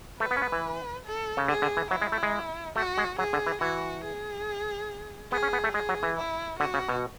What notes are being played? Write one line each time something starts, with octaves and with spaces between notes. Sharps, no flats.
A3 B4
B3
C#4
B3
E3
A4
C#3
D3 G#4
D3
E3
F#3 E4
G#3
A3
G#3
A3 F#4
G#3
F#3 G#4
D3
E3
E3 F#4
G#4
B3 G#4
C#4
B3
A3
G#3 G#4
F#3
E3
E4
D3 F#4
C#3
B2